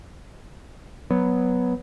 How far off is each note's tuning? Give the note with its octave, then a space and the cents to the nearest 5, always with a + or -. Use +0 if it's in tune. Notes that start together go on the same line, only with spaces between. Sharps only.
F#3 +0 B3 +0